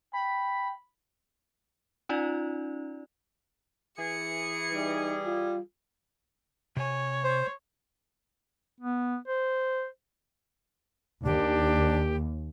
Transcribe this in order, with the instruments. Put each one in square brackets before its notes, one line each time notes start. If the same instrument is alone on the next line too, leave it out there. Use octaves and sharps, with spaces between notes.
[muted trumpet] G5 [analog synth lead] B5
[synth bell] C#4 D#4 F4 D5
[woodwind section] E3 G#4 [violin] C#7
[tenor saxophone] G3 [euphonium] D#4
[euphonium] F4
[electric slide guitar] C3 G#5 [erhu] C#5
[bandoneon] C5
[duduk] B3
C5
[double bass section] D#2 [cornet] D4 [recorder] G4